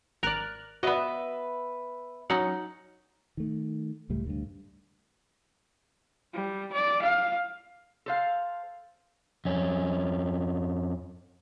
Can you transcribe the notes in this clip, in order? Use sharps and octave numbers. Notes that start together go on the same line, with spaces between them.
G#1 A#4 D5 F6 F#6
B3 F#4 B4 D#5 E5
F#3 C#4 D#4 F#5
D#3 A3
C#2 A2 G3 A3
D2 G2
G3
D5
F5
A4 C5 F5
F2 C#4